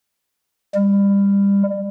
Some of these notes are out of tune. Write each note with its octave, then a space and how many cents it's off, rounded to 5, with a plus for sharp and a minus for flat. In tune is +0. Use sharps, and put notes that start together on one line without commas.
G3 +25